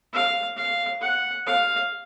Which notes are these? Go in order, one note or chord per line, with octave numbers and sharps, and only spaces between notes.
F5
F5
F#5
F5